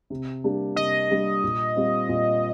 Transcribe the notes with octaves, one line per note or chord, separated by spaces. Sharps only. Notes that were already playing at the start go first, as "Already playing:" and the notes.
C3
G3 A#3 D4 G4
C3 D#5
G3 A#3 D4 G4
A#2
G3 C4 F4
A#2